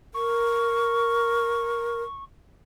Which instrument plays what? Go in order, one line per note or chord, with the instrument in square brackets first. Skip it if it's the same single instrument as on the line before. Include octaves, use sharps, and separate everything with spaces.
[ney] A#4 [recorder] C#6